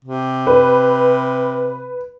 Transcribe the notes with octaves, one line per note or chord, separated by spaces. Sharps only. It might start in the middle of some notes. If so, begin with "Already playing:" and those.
C3
B4